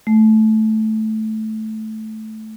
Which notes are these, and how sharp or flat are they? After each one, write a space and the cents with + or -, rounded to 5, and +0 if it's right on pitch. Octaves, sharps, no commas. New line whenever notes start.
A3 -10